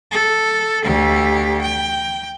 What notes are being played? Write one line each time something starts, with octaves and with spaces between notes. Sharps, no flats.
A4
D2 G4
G5